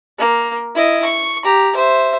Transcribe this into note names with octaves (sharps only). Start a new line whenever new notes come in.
A#3
E4 D#5
C#6
G4 A#5
C5 E5